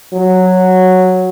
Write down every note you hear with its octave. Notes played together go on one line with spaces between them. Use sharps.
F#3